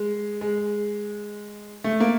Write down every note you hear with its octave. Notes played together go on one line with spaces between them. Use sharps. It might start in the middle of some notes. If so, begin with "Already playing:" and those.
Already playing: G#3
G#3
A3
A#3